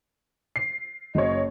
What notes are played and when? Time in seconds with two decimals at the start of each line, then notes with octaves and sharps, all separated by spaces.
0.56 C7
1.15 F#1 C#5 D#5